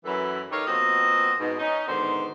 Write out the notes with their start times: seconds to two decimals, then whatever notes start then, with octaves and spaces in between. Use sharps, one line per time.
0.05 F#2 E3 F#3 E4 A4 B4
0.51 D#4 G4 A4 A#4 C#5 F5
0.67 B2 F3 A#3 C4 F#4 D#5
1.39 G#2 B2
1.59 C#4 D#4
1.88 G#2 B2 D3 D#3 C5